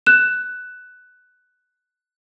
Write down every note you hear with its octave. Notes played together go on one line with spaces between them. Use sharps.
F#6 E7